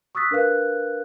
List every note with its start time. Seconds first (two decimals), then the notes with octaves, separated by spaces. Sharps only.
0.15 C#6 D#6 E6 F#6 A6 B6
0.31 D4 A#4 B4 F5 F#6